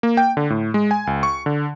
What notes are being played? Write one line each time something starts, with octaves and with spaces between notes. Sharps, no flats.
A#3
G5
D3
A2
G#3
G#5
C#2
C#6
D3